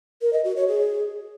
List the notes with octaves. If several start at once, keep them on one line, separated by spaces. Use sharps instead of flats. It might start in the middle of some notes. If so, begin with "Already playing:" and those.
A#4
D#5
F#4
C#5
G#4